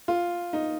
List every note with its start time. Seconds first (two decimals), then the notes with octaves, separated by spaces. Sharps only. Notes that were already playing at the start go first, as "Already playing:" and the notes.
0.08 F4
0.53 D#4